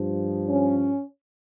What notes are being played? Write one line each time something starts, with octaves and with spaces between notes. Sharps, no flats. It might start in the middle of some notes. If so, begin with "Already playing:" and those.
Already playing: G2 F3
C#4